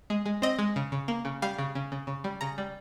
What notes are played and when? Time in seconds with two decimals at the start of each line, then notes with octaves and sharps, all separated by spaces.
0.10 G#3
0.26 G#3
0.42 C4 D#5
0.59 G#3
0.76 C#3
0.92 C#3
1.08 A#3
1.25 C#3
1.42 G3 F5
1.58 C#3
1.75 C#3
1.92 C#3
2.07 C#3
2.24 G3
2.41 C#3 A#5
2.58 G3